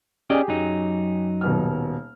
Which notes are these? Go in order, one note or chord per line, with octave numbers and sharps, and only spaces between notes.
C#4 G4 G#4 D5 D#5
F#2 F#3 D#4
D#1 B2 F6